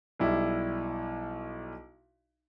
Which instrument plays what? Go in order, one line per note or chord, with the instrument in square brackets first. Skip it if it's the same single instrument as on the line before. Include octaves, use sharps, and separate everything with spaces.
[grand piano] B1 G3 E4